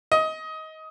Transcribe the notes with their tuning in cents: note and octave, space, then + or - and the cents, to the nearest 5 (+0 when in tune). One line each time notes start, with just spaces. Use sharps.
D#5 +20